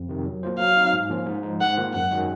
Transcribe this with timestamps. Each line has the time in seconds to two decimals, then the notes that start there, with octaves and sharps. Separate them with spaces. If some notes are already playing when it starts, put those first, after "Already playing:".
Already playing: F2
0.09 C3 D#3
0.26 F#3
0.43 A#3 F4 C5
0.59 F#3 F5
0.76 C4 D#4
0.93 G#2
1.10 F3 A#3 C#4 F4
1.26 G#2
1.43 F3 G#3 D#4
1.60 G#2 F#5
1.77 D#3 A#3 F4
1.94 F#2 F#5
2.11 D#3 G#3 C#4 F#4